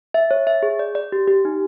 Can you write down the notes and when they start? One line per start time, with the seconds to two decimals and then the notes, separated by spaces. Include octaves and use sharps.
0.14 E5
0.31 C#5
0.47 E5
0.63 G#4
0.79 D5
0.95 D5
1.12 G4
1.28 G4
1.45 D#4